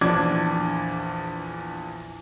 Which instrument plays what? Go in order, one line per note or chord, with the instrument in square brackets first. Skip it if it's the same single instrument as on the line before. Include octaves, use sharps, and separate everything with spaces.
[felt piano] A#1 E2 D4 D6 G#6